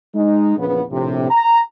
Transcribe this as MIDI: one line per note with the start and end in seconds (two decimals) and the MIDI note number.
0.15 0.57 56
0.15 0.57 63
0.57 0.82 34
0.57 0.82 40
0.57 0.82 49
0.57 0.82 59
0.90 1.28 34
0.90 1.28 45
0.90 1.28 48
1.30 1.59 82